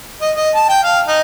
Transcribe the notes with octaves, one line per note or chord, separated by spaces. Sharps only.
D#5
D#5
A5
G5
F5
D#4